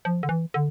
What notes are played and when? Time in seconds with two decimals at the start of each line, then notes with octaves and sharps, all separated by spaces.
0.05 F3
0.23 D3
0.29 E3
0.54 D3